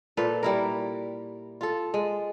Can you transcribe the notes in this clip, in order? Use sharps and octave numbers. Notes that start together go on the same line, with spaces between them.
A#2 A4 B4 F5
G3 E4 A#4
F4 A4
G#3